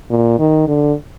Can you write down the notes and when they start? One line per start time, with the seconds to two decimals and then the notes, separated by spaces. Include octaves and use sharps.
0.10 A#2
0.39 D#3
0.68 D3